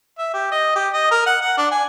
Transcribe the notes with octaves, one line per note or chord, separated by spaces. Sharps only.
E5
G4
D#5
G4
D#5
A#4
F#5
F#5
D4
G#5